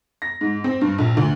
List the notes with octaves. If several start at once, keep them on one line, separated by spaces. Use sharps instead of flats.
A#6
G#2
C4
G2
A#1
D2